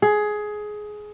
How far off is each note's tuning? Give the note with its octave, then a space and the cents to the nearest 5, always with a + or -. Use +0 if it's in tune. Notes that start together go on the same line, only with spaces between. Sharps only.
G#4 +15